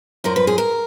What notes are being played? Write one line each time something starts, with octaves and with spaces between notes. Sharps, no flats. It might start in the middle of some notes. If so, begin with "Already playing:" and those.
F#2 F3 A#4
B4
G#4
A#4